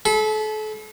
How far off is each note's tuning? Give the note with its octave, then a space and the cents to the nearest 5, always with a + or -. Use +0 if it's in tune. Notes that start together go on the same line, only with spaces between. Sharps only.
A4 -35 B5 +0